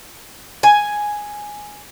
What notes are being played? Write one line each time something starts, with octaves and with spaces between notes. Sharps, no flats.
G#5